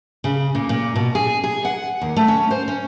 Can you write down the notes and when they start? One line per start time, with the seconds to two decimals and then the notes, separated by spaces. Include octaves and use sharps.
0.24 C#3
0.55 A#2
0.69 A#2
0.96 B2
1.15 G#4
1.44 G#4
1.65 F#5
2.01 D#2
2.17 A3
2.28 C#4
2.51 C5
2.68 C#4